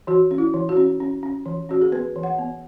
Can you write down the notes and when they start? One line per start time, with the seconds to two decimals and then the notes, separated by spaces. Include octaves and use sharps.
0.07 E3 F#4
0.31 C#4
0.38 E4
0.54 E3
0.69 F#4
0.77 C#4
1.00 C#4
1.23 C#4
1.46 E3
1.69 C#4 F#4
1.81 G#4
1.92 B3 B4
2.16 E3
2.23 F#5
2.38 B3